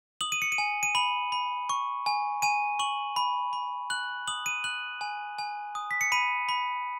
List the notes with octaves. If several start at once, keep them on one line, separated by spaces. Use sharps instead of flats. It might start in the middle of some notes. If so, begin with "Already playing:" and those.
D#6 F#7
D#7
C#7
D#7
G#5
D#7
B5 F#7
B5
C#6
G#5
G#5 D#7
C#6 F#7
B5
B5
F#6 F#7
D#6 F#7
D#7
F#6 F#7
G#5
G#5
D#6
B6
C#7
B5 D#7
B5